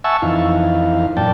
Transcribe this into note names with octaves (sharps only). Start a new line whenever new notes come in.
E5 F#5 G#5 A5 C#6 E6
F2 E3 D#4 F5
F#2 A#2 D5 G5 A5